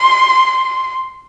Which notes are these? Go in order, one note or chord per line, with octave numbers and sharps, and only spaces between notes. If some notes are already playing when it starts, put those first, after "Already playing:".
Already playing: C6